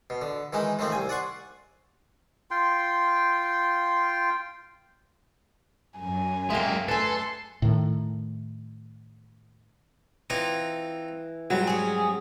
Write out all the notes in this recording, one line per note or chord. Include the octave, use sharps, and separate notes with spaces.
B2
D3
D#3 E3 G#3 D#4
D#3 F3 A3 C4
C2 G#5
D5 F#5 C6 C#6
F4 G5 C6
F#2 G#5
G#3 A#3 E5 G5
A3 A4 B4 G#5 C6
A2 D#3
E3 C4 D#4 F4
G#2 F#3 G3 C4
C#4 G#4